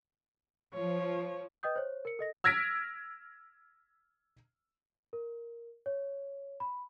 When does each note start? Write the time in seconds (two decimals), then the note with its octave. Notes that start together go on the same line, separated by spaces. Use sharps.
0.74 F3 C#5
1.63 B4 D#5 G5 D#6 G6
1.76 C5 C#5
2.05 A#4 C#7
2.19 A4 D#5 A#6
2.44 E6 F6 G#6 A#6 B6 D7
5.13 A#4
5.86 C#5
6.60 B5